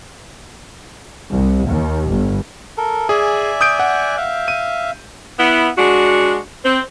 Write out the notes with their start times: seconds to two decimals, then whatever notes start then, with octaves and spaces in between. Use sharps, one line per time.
1.31 C2
1.68 D#2
2.11 G1
2.77 A4 A#4
3.09 G#4 D5 E5 G#5
3.61 D#6 G6 D7
3.79 F#5
4.17 E5 F5
4.48 D#7
5.39 B3 E4
5.78 G#3 D4 F#4
6.65 C4